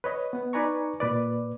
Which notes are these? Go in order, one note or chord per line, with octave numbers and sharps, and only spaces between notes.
B4 C#5 D#5
B3 F#5
D#4 B4 D5 G#5 A#5 C#6
A#2 B4 D5